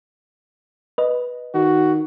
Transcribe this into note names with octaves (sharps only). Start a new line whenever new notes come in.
B4 D#5
D#3 F#4